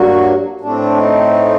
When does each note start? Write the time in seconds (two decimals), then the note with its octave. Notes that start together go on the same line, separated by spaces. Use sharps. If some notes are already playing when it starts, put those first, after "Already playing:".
Already playing: G2 F#3 A#3 F#4
0.61 A2 A3 C4 D4
0.97 D#4